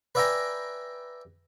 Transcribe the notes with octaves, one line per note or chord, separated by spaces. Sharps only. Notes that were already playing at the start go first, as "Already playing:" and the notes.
B4 D5 E5 G5 G#5 A#5